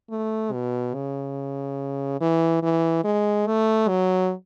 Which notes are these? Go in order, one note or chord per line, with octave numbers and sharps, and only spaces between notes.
A3
B2
C#3
E3
E3
G#3
A3
F#3